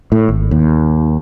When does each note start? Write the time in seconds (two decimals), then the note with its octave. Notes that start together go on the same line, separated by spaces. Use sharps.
0.12 A2
0.29 G#1
0.51 D#2